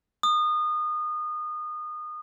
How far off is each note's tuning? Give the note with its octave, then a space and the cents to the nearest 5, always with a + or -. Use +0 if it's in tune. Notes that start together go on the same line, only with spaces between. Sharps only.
D#6 -25